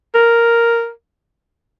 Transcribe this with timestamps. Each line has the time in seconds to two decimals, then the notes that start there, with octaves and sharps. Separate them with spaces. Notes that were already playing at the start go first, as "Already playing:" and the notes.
0.14 A#4